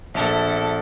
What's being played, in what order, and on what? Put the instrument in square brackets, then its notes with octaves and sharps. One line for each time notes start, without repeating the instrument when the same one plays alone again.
[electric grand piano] A#1 A5 [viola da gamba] E4 A4